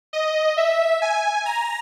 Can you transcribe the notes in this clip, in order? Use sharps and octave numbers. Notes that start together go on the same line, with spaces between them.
D#5
E5
G#5
A#5